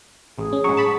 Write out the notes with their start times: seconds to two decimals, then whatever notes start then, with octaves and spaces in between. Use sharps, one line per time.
0.38 A1 G#4
0.53 C#4
0.64 G#2 F#3 C#6
0.77 A5 B5